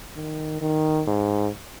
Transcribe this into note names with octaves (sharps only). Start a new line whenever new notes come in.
D#3
D#3
G#2